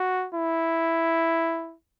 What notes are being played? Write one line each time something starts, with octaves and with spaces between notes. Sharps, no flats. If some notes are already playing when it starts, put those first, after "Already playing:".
Already playing: F#4
E4